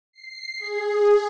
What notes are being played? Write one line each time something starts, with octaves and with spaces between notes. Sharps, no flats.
C7
G#4